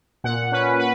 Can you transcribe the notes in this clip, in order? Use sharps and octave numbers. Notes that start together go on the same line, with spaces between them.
A#2 F#5
C#4 B4
B4